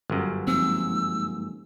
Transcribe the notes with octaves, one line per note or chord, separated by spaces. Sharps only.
G1 F#2
F3 G#3 A#3 C4 D#4 E6